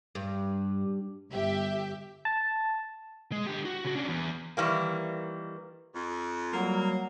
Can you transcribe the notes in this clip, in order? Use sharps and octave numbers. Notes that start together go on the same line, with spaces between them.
G2
G1 G4 E5
A5
G#3
D3 G4
F#4
C#3 F#4
C#4 D4
E2
D#3 E3 G3 A#3
F2
F#3 G3 A#3